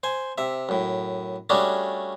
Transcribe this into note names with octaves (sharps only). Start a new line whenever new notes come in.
C5 G#5
C3 E5
F#2 A2
G3 A3 C#4 D4 F#4 G#4